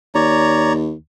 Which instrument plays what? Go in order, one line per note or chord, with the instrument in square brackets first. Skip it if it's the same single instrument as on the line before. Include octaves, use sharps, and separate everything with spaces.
[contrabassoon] D#2 [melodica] C#5 D5 A#5